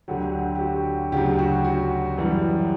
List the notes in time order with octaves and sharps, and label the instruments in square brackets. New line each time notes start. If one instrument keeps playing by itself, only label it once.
[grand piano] D2 D3 F#3 G4
G4
F#4
D2 C#3 F#3 G4
F#4
F#4
F#2 E3 G3